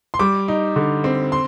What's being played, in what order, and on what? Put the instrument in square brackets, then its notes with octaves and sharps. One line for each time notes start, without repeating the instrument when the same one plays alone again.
[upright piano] C6
G3 D6
D#4
D3
C4
C6